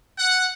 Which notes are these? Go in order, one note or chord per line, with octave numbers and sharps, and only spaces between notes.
F#5